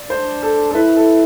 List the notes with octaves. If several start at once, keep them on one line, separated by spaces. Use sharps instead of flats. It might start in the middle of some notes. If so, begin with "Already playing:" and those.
Already playing: D5
D4 C5
A4
A4
E4 B4
A4